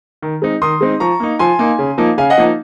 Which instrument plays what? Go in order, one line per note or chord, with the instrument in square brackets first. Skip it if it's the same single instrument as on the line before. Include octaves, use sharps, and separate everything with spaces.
[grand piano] D#3
G#3 C4 D#4
D#3 C6 D#6
G#3 C4 D#4
F3 A#5 C#6
A#3 D#4
F3 G#5 C6
A#3 D#4
C#3
F3 A#3 D#4
C#3 F5 G#5
D#5 F#5
F3 A#3 D#4